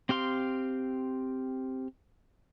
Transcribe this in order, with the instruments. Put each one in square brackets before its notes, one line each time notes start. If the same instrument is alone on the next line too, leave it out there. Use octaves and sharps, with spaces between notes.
[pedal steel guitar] C4 G4 F5 C6